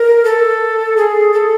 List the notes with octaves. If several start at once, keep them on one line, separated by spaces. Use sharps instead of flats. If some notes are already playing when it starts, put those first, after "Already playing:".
Already playing: A#4
A4
G#4
A4